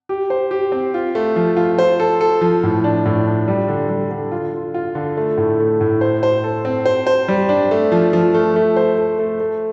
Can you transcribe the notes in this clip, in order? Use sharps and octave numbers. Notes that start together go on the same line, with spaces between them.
G4
C5
G4
C4
F4
A3
F3
F4
C5
A4
A4
F3
A2
D4
A2
D4
G3
D3
G3
D3
F4
F4
F4
D3
A3
A2
A3
A2
C5
C5
A4
C4
C5
C5
G3
D4
A3
F3
F3
A3
A3
C5
A3
A3
A3